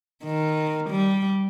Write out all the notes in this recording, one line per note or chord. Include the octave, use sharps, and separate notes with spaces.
D#3
G3